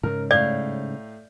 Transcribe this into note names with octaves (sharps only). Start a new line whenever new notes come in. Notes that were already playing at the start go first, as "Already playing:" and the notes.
G#2 C#3 A#4
A2 D5 F5 G6